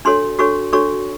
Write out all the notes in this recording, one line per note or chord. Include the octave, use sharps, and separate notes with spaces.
D4 F#4 A4 C#5 C6
D4 F#4 A4 C#5 C#6
D4 F#4 A4 C#5 C#6